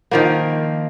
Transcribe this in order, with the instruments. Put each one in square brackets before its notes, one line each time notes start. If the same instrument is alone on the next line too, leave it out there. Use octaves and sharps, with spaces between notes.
[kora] D#3 F3 A#3